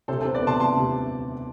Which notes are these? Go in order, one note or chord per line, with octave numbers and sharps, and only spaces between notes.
C3 A4 C5
B3 A4 C5
B4 D5
C3 A5 C6
C3 A5 C6
C3